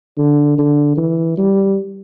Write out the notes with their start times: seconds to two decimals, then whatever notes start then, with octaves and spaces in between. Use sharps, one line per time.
0.17 D3
0.58 D3
0.97 E3
1.37 G3